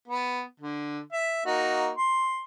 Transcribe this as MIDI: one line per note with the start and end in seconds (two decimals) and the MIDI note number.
0.08 0.43 59
0.60 0.99 50
1.12 1.42 76
1.46 1.90 58
1.46 1.90 63
1.46 1.90 66
1.97 2.44 84